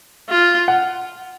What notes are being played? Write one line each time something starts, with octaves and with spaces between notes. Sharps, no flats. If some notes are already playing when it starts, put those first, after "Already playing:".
F4
F#5